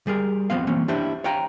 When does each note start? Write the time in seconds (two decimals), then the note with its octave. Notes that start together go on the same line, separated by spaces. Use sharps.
0.07 G3 G#4 A#4
0.50 F3 B3 C4 F5
0.67 E3 A#3 C4 C#4
0.88 D4 E4 G4 C5 E5
1.24 C#5 F5 G5 A#5